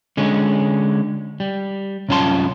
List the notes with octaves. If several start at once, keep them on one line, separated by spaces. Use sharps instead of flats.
D3 G#3 C#4
G3
C2 F#2 C#4 F4 A5 C6